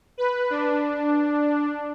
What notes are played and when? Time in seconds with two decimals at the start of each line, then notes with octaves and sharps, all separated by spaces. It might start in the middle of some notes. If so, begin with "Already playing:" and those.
0.18 B4
0.50 D4